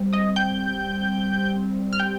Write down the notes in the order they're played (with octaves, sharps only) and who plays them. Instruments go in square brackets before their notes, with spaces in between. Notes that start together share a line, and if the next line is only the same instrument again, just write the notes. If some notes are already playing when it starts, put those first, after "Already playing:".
Already playing: [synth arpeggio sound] G3 C4
D#5 D#6
G5 G6
F6
G5 G6